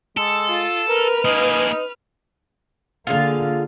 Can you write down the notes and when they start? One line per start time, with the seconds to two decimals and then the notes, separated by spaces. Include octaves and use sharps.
0.17 G#3 A4
0.48 F4
0.89 A#4 B4 F6
1.25 A#3 D#4 G#4
3.07 D3 A#3 F4 G#4 F5